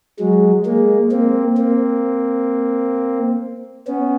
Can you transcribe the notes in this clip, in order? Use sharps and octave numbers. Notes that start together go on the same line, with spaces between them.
F#3 G#3
G#3 A#3
A#3 C4
A#3 C4
B3 C#4